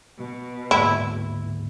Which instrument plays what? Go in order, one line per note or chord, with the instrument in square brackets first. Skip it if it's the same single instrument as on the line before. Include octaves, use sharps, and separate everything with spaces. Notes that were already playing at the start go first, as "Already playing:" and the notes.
[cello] B2
[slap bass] D1 G#2 A#3 [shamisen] E4